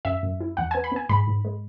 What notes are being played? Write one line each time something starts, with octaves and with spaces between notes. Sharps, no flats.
F#2 E5
F#2
E4
E2 F#5
B3 G#5
B5
B3 G#5
G#2 B5
G#2
G#3